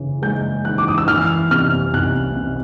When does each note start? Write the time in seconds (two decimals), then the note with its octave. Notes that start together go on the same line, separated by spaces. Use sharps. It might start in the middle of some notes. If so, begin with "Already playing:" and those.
Already playing: C#3 E3
0.22 G#3 G6
0.65 E3 F#6
0.78 D6
0.88 D#6
0.98 E6
1.07 E3 F6
1.51 C3 F6
1.93 C2 F#6
2.37 C3